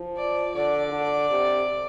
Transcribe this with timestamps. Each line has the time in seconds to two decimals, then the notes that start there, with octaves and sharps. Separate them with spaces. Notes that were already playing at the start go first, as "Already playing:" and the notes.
Already playing: F3
0.17 D5
0.54 D3 D5
0.92 D3
1.30 C3